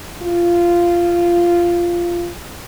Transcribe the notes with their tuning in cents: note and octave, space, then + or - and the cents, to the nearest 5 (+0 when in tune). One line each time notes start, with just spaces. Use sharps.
F4 -10